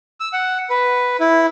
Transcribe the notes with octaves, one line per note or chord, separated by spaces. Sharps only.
E6
F#5
B4
E4